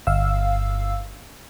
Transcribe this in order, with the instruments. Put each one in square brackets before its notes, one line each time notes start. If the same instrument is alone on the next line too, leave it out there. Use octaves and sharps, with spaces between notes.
[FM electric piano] G1 F5 E6